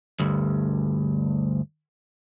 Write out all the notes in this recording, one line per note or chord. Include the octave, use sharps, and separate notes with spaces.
D2 G2